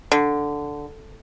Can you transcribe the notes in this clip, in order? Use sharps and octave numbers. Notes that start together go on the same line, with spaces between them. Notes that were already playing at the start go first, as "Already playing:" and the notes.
D3